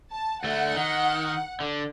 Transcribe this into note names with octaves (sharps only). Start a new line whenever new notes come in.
A5
D2 A3 F#5
D#3
D3